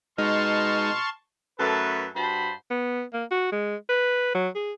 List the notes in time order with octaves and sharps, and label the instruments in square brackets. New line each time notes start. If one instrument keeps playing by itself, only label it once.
[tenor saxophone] B2 [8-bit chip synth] G#3 D#4 [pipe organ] A5 C6 C#6 [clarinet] F6
[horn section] F#2 A3 A4 B4
G2 F#4 C5 A5 B5
[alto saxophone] B3
A#3
F#4
G#3
B4
F#3
G#4